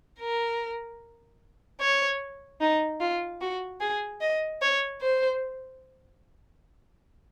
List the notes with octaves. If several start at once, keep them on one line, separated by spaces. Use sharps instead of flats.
A#4
C#5
D#4
F4
F#4
G#4
D#5
C#5
C5